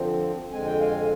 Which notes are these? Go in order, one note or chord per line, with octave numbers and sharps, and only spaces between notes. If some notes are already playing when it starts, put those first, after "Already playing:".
Already playing: D3 F3 C4
F2 D3 G#3 C4 G#5
G5
F5 G#5